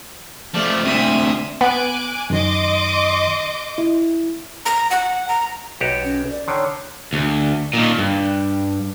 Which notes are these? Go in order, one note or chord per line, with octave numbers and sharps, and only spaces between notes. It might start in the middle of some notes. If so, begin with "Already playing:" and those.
F3 A3 D5
D2 C3 E5 D#6
B3 G#5 D6 F#6
F#2 D#3 D#5 C6 D6
E4
A#5
F#5
A#5
B1 F#4 G4
C#4
D5
D3 D#3 C#5
D2
A#2 D#3
G2